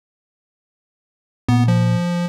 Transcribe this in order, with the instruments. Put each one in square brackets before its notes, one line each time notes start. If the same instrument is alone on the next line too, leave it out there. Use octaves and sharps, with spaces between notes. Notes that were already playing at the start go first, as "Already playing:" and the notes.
[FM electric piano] A#2 [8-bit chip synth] B3
[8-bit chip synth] F3